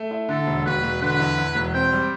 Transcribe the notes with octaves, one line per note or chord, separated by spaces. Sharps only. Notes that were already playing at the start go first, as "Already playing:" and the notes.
Already playing: A3
E4
D3 A4
E1
E1 B4
E1
D3 B4
E2
E2
E1
C4 G5
G3